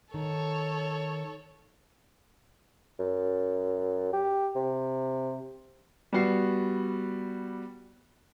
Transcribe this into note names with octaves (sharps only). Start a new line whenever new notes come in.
D#3 A4 C#5
F#2
G4
C3
G3 B3 F#4 C7